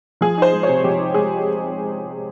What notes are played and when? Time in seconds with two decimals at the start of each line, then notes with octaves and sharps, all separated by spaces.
0.21 F3 G#4
0.38 D#4 C5
0.53 G#3
0.63 C3 C#5
0.84 F3 G4
0.99 D#4
1.14 G#3 G#4